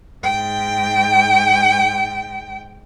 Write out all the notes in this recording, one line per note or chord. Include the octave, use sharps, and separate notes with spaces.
G#2 G5